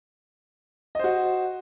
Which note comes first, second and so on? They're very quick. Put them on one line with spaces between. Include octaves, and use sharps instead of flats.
D#5 C5 F#4